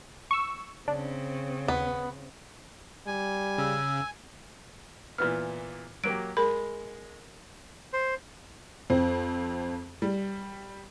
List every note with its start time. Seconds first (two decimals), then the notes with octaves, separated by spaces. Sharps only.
0.31 C#6 E6
0.88 C#3 C4 D4
1.68 D#2 B3
3.06 G3 G#5
3.58 C#3 E6
5.18 A#2 E3 B3 F6
6.04 F#3 A#3 G4 D7
6.37 G#3 A#4 B5
7.93 C5
8.90 F2 C4
10.02 G3